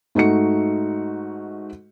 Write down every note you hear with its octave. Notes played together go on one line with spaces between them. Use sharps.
G#2 A3 D#4 F#4 C#7